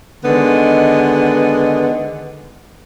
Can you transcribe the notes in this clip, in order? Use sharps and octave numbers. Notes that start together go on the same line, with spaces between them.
D3 D#3 G#3 B3